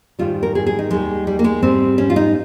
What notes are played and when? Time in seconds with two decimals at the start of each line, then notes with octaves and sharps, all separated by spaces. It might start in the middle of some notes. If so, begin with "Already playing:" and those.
0.19 G#2 D#3 G3 F4
0.43 A#4
0.55 G#4
0.66 G#4
0.79 D#4
0.91 D#2 D#3 G3 G#3
1.27 G3
1.39 A#3
1.44 G#3
1.62 G#2 G3 C4
1.98 C#4
2.10 F4
2.16 D#4